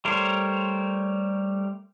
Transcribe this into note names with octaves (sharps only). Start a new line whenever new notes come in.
G3 A3 A#4 C5 C#5